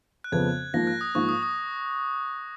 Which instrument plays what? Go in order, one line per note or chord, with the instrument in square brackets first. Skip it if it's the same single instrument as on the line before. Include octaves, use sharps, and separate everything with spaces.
[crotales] F#6
[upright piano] F2 C#3 F3 B3 [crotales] G#6
[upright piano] G#2 F3 A#3 [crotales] A#6
[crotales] F#6
D#6
[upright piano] G#2 F3 A#3 [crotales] C#6
[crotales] D#6
D#6